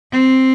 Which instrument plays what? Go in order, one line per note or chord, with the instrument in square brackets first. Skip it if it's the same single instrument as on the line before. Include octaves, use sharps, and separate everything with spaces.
[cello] C4